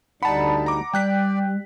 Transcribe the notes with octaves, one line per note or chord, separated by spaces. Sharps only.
D2 G3 D#4 F#5 A5 B5
A#5 D6
G3 D5 G5 F#6 B6